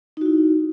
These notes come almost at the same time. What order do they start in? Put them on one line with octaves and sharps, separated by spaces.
D#4 F#4 E4